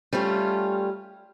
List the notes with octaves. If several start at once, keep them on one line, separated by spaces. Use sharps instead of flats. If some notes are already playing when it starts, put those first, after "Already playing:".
G3 A3 C#4 F4